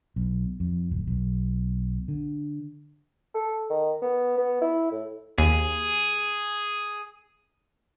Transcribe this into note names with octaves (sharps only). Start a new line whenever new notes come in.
B1
F2
D1
B1
D3
A4
D#3
B3
B3
E4
A2
D#2 G#4